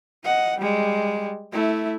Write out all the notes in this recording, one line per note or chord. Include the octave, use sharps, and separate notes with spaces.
D#5 F#5
G3 G#3
A3 E4